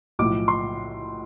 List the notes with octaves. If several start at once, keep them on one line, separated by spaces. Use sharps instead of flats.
B1 A2 F3 D6
C6